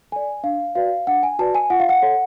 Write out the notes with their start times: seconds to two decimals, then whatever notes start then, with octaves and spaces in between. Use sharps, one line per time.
0.12 A4 D5 G#5
0.44 D4 F5
0.75 F#4 B4 D5 F5
1.07 D4 F#5
1.23 G#5
1.39 F#4 B4 D5 A5
1.55 G#5
1.70 F4 F#5
1.80 F5
1.89 F#5
2.02 A4 C#5